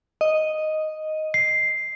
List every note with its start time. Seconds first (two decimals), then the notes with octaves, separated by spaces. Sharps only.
0.21 D#5
1.34 C7